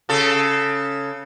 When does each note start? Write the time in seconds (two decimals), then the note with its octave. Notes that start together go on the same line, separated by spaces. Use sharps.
0.09 C#3 A4